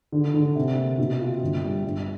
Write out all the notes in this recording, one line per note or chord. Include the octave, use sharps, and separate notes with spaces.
D3
D3
C3
A#3
B2
F4
G1
G3
G2